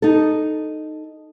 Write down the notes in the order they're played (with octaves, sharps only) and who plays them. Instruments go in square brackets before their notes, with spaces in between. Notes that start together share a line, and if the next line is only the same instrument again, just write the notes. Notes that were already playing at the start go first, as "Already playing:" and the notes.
[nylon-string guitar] D#4 A4